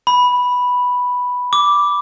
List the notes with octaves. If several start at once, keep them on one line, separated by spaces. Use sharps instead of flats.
B5
D6